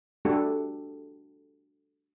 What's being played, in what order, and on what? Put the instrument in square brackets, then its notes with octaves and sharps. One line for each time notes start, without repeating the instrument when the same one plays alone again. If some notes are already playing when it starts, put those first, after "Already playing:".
[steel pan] G3 A3 D4 F#4 G4 A4